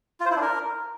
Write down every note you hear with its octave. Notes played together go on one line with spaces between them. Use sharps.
F4
C5
E4
D4
A#4